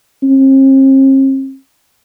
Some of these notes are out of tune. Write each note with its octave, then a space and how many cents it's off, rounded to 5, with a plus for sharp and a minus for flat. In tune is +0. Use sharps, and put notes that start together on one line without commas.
C4 +45